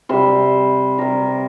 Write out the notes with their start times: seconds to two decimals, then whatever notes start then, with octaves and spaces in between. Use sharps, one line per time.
0.09 C3 G3 C5
0.98 C3 G3 A#4